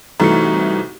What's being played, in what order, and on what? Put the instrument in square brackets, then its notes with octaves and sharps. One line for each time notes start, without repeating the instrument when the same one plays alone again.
[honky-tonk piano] C2 E3 A3 [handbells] D#4 F#4 C#7